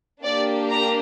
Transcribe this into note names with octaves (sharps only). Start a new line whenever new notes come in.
A#3 D4 G4 D5
A#5